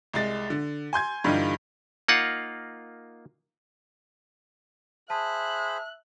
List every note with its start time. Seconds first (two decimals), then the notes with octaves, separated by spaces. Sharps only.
0.14 C2 G#3 A6
0.50 D3
0.93 G#5 C6 G6 G#6
1.24 G2 D3 E3 G3 D#4 F4
2.08 A#3 D#4 F4 F#5
5.10 G#4 C5 E5 A5 B5 F#6